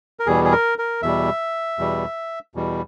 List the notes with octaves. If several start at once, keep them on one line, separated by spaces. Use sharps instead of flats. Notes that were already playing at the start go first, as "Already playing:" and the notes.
A#4
E2 B2 G3 G#4
G#4
A#4
A#4
E2 B2 G3 E5
E2 B2 G3
E2 B2 G3